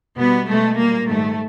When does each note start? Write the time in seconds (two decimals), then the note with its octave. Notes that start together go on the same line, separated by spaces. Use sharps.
0.17 B2 G3 B3
0.47 B2 G#3 A3
0.77 A#2 G3 A#3
1.08 G#2 D#3 G3 A3